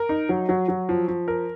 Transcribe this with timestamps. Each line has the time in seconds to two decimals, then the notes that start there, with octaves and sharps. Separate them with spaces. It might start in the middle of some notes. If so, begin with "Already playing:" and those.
Already playing: A#4
0.09 D#4
0.29 F#3
0.49 F#3
0.68 F#3
0.89 F3
1.08 F3
1.28 A#4